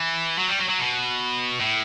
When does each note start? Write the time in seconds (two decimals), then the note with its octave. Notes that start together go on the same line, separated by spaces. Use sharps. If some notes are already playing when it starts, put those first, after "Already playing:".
Already playing: E3
0.38 F#3
0.48 G3
0.58 F#3
0.69 F#3
0.79 B2
1.60 A2